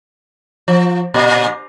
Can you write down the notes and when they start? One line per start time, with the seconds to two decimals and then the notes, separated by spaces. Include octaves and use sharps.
0.68 F3
1.14 A#2